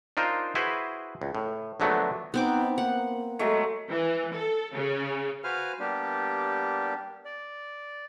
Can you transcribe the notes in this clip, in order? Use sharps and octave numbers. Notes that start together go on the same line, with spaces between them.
D4 D#4 F4 A#4 C5
E4 F#4 G#4 B4 C5
C#2
A2
A#1 D3 F#3 A3 B3 D4
B3 C4 D#4 D6
A#3 F#5
F#3 G#3 A3
E3
A4
C#3
F#4 B4 C5 F5 G#5 F6
G3 A#3 B3 D4 G4
D5